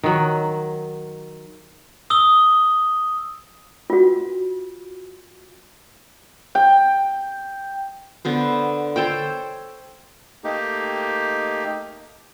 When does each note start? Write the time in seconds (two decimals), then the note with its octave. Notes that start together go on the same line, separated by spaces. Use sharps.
0.03 D#3 F#3
2.10 D#6 E6 G7
3.90 F4 F#4
6.55 G5
8.25 D3 B3 C5
8.96 A4 C5 C#5 G5
10.44 A3 A#3 D#4 G4